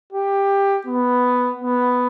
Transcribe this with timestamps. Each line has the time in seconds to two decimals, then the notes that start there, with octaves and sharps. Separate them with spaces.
0.13 G4
0.86 B3
1.62 B3